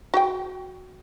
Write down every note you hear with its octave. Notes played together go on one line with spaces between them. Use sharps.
F#4 G#4 G5